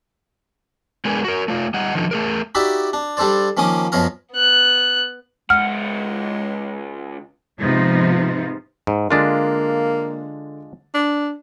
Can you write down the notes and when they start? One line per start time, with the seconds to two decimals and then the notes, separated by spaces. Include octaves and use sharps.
1.05 G#3 B3 D4 G#4 A#4
1.24 F#4 A#4
1.48 A3 F4
1.74 G3 D#5 F#5
1.95 D3 D#3 F3
2.11 A3 G#4 A#4
2.55 D#4 E4 F#4 G4 D5 E5
2.93 D4
3.17 G3 D4 A4 C5 D5
3.57 D#3 F3 A#3 C#4 D6 D#6
3.92 F#2 B2 F3 C#5 F5 A#5
4.32 B3 F#6
5.50 C#2 G#3 F#5 F6
7.59 G#2 C3 F3 B3 D#4 F4
8.87 G#2
9.11 D3 G#3 A#3 D4 F4 A6
10.94 D4